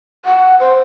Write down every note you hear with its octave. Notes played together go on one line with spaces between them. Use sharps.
F#5
C5